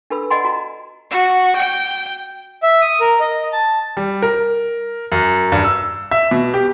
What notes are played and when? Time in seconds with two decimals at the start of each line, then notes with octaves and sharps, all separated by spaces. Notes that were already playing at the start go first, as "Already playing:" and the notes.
0.10 D4 A4 B4 B5 E6
0.30 D5 D#5 F#5 G#5 B5 C6
0.45 F#4 A#5
1.10 F#4
1.56 G5
2.63 E5
2.81 D#6
3.01 A#4
3.20 D#5
3.53 A5
3.97 G3
4.22 A#4
5.12 F#2
5.52 G2
5.64 E6
6.11 E5
6.31 B2
6.54 G4